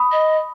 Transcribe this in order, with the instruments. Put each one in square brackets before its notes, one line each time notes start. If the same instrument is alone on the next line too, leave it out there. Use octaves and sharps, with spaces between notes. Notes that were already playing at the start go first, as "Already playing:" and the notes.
Already playing: [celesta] B5 D#6
[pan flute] D#5